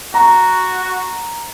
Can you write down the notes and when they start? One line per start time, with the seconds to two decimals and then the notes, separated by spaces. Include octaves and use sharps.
0.14 F#4 A#5